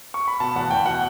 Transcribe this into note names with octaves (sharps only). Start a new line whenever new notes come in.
C#6
B5
B2 A5
E2 F#5
E2 G5
B2 F#5